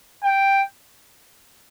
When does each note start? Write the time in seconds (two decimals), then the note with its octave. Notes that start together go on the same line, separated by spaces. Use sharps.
0.23 G5